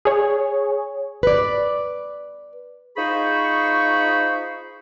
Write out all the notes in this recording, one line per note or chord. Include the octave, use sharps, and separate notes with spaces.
G#4 C#5
B4 D5
D#4 F4 G#4 C5 B5 C#6